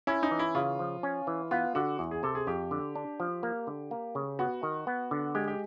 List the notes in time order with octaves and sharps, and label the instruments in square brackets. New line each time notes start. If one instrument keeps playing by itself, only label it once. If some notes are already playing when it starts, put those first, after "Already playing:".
[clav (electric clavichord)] C#4 [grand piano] E4
[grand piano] D#4
[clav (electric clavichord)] E3
[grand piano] E4
[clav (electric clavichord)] C#3 [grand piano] F4
[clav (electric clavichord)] F3
C#4
E3
[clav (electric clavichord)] B3 [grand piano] F4
[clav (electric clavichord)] D3 [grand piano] F#4
[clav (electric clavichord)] E2
[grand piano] G#4
[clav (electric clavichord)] C3 [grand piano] A4
[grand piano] G#4
[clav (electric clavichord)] F2 [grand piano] G4
[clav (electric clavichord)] D3
D4
F3
A#3
D3
A#3
C#3
[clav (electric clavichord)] B3 [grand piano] F#4
[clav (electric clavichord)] D#3
B3
D3
[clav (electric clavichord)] G#3 [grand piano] G4
[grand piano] G4